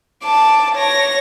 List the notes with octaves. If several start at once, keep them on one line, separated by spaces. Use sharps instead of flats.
A5 D6
C#5 A#6